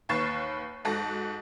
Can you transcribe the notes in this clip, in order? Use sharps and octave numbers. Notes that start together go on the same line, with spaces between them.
D#2 B4 C#6 A6 C7 E7
G#2 F#4 A4 A#6